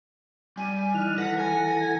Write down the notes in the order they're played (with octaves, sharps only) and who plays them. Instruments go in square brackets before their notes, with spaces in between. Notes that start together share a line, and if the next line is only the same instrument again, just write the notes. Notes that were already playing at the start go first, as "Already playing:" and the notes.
[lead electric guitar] G3 [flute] G#5
[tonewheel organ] E3 D#4 F6 [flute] F#6
[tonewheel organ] E3 A4 A#6 [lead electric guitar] B4 [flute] F#5
[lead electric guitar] G#5
[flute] G#6